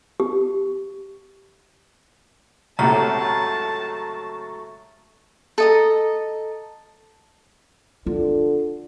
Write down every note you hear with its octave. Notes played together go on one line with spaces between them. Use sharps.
G4
C#2 A2 C3 F#3 A3 A5 A#5
A4 D#5 A#5
D3 F4